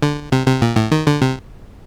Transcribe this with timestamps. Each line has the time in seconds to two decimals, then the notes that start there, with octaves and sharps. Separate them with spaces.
0.03 D3
0.32 C3
0.47 C3
0.62 A#2
0.76 A2
0.92 D#3
1.07 D3
1.22 C3